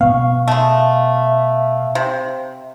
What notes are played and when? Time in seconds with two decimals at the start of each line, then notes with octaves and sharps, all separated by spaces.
0.01 B2 B3 F5 C#6
0.48 G#3 A3 E5
1.95 C3